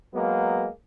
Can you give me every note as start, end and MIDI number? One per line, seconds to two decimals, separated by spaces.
0.14 0.67 54
0.14 0.67 56
0.14 0.67 58
0.14 0.67 59